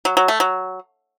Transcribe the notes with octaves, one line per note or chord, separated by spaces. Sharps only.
F#3
F#3
A3
F#3